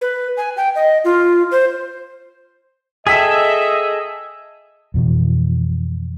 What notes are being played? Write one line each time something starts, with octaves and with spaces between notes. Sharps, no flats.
B4
G#5
G5
D#5
F4
C5
G#4 A4 D#5 E5 G5 B6
F2 B2 E3